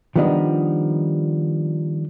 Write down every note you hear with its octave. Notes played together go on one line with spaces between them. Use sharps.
D#3 F3 G3 B3 D4 D#4